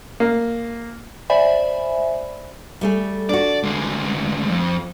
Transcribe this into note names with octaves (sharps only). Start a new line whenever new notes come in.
A#3
C5 D5 E5 G#5 B5
G3 A3 G#4
D4 F#4 D5
D2 G#3
F2